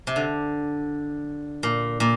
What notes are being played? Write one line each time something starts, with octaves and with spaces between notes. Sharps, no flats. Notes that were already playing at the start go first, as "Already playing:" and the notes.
C3
D3
A#2
A#2